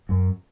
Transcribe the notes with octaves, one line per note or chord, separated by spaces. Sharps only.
F#2